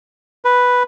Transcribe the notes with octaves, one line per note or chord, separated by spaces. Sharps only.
B4